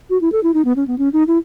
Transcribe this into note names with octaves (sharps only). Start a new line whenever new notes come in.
F#4
E4
A4
E4
D#4
B3
C#4
B3
C#4
D#4
E4